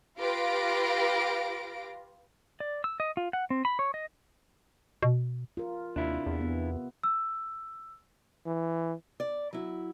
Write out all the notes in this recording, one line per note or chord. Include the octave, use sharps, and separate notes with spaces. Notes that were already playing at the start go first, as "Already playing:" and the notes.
F4 G4 B4 F5 A#6 D7
D5
E6
D#5
F4
F#5
C4
B5
C#5
D#5
B2
F4 A#4
D#2 C3 D4 E4 F4 E5
E2
B3
E6
E3
D5
F#3 E4